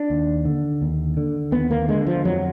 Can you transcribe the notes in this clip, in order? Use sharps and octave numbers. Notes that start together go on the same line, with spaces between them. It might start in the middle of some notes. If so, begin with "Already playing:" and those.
Already playing: D4
D#2
D3
D#2
D3
D#2 B3
A#3
D3 G#3
F3
F2 F#3